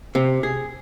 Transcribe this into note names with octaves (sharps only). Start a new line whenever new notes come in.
C3
G#4